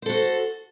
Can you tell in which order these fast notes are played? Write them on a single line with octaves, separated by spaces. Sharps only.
C5 A4 F#4